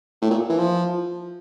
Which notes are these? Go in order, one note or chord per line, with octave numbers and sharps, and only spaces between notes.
A2
A#2
E3
F3